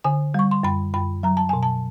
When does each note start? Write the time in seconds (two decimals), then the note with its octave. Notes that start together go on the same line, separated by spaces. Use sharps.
0.04 D3 G#5
0.34 G3 C#6
0.51 C6
0.63 F#2 B5
0.94 F#2 B5
1.23 F#3 A#5
1.37 A5
1.49 B2 G#5
1.63 A5